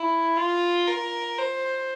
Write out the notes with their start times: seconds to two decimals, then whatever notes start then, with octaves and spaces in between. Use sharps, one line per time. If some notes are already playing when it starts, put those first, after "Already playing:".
Already playing: E4
0.37 F4
0.87 A#4
1.38 C5